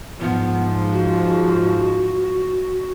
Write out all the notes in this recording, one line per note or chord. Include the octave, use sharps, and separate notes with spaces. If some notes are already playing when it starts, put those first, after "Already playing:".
G#2 F3 B3
F#4